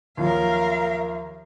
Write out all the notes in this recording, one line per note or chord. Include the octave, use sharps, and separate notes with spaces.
D#2 F3 F#3 A#4 E5 F5